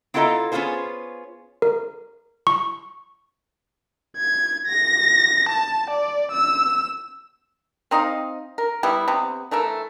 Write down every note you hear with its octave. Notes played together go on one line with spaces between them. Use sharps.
B3 E4 F4 A4 D#5 A#5
B3 C#4 E4 F4 G#4 C5
A#4
C#6
G#6
A#6
A5
D5
E6
C4 D#4 D#5 F5
A#4
G3 B3 E4
C3 B3
E3 A3 A#4 E5